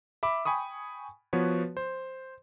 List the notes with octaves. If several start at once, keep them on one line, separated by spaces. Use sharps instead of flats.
E5 B5 D6
G5 G#5 B5 C#6 D#6
F3 B3 F#4 B4 C#5
C5